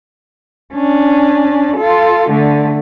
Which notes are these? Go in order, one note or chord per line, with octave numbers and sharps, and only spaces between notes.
C#4 D4
F4 A4
D3 A3